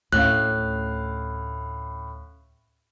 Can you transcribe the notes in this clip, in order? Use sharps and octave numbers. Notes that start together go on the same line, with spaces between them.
D2 A2 C#4 F5 F#6